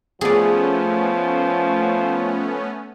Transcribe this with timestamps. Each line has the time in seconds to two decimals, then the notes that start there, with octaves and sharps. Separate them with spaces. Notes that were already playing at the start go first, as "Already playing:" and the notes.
0.21 F3 A3 B3 C#4 G#4 D5